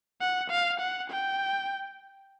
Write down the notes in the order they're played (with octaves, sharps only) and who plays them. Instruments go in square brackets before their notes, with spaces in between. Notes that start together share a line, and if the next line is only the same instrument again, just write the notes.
[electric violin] F#5
F5
F#5
G5